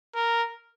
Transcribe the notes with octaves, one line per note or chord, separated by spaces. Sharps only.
A#4